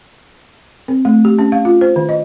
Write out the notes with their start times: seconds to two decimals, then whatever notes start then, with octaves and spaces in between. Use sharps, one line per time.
0.88 C4
1.05 A3
1.25 G4
1.39 C#4
1.52 F5
1.65 F4
1.81 C5
1.96 D#3
2.09 D#5